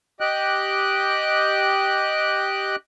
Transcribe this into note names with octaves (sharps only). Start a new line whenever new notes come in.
G4 D#5 G5 F#6